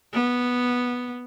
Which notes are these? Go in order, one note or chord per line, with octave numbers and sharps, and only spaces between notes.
B3